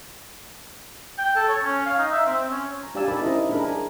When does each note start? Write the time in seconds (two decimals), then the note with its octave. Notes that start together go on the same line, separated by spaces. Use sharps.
1.18 G5
1.36 A4
1.49 C#5
1.64 C#4
1.86 F5
1.99 D#4
2.12 E5
2.26 C4
2.51 C#4
2.83 A#5
2.95 D4 G4 D5 F5 G#5 E6
3.08 D#4 A#4 G5 A5 B5 D6
3.21 C#4 E4 A#4 C5 D#5
3.49 D4 G#4 A#4 B5
3.63 G#4 A#4 G#5